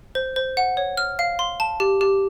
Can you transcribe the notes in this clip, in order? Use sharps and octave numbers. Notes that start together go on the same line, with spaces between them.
C5
C5
F#5
C#5
F6
F5
C6
A5
G4
G4